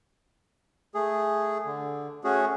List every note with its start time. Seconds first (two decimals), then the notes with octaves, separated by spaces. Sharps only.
0.95 A3 G#4
1.66 D3
2.24 A3 C#4 F#4 G#4